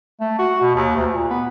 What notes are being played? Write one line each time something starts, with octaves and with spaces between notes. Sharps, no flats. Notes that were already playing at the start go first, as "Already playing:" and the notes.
A3
F#4
B2
D#2
D2
A#2
B3